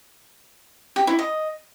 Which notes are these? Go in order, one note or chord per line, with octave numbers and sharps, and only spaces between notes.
G4
E4
D#5